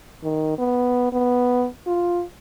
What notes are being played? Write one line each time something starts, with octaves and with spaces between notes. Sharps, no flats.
D#3
B3
B3
F4